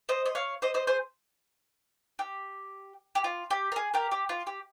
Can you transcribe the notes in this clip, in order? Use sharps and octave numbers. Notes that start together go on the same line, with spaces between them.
C5 D#5
D#5
C#5 F5
C5 D#5
C5 D#5
G#4 C5
G4
G4
F4
G4
A#4
G#4
G4 A#4
G4
F4
G4